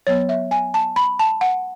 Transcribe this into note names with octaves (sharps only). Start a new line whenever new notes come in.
F#3 B3 C#5
E5
G#5
A5
B5
A5
F#5